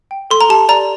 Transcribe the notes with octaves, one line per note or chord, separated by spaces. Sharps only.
G5
A4 C6
A#5
G4 A5
D5 A#5